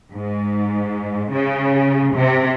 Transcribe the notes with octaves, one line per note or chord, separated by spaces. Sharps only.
G#2
C#3
C3